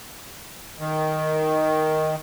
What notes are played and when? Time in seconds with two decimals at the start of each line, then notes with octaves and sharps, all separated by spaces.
0.79 D#3